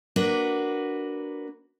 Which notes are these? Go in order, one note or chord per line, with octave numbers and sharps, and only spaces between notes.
A#3 D4 F#4 B4